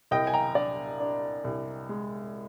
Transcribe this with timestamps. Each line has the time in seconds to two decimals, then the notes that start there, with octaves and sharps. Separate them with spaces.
0.11 C2 D#5 G5
0.27 G#5
0.33 G5 A#5
0.55 D4 D5
1.00 D4
1.44 C2
1.89 G#3